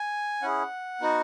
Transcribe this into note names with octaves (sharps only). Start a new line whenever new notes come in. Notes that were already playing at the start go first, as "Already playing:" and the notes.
Already playing: G#5
C#4 E4 G#4 F#5
B3 D#4 F#4